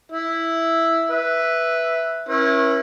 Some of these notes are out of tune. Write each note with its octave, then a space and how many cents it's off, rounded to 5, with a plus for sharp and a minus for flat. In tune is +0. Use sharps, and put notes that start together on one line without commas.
E4 +0 E5 +0
B4 +0 E5 +0
C#4 -25 E4 +0 A#4 +45